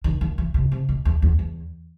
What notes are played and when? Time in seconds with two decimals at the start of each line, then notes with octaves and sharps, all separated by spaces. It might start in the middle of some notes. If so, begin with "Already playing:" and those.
0.04 D#3
0.21 D#3
0.38 E3
0.54 C3
0.72 C3
0.89 B2
1.05 E2
1.22 E2
1.39 E2